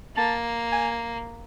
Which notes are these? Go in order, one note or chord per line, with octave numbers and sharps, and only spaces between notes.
A#3 A5
G#5